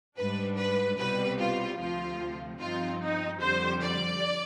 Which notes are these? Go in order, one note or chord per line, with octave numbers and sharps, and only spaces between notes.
G#2 G3 D4 B4
B4
C2 B2 G3 B4
F4
D2 C3 F3 C4 F4
G2 F3 C4 D#4 F4
D#4
F2 D3 G3 C5
D5